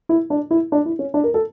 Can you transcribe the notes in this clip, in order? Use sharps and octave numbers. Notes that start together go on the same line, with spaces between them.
E4
D4
E4
D4
E4
C#4
D4
A#4
A4